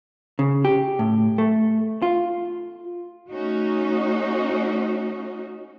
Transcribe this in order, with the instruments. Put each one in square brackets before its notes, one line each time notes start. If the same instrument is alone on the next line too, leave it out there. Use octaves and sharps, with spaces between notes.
[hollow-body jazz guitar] C#3
G4
A2
A3
F4
[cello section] A3 C#4 D#4 F#4